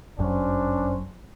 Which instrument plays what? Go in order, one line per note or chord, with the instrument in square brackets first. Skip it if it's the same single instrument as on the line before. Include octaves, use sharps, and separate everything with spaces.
[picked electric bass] G1 F#2 F#3 [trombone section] C#4 D4 C5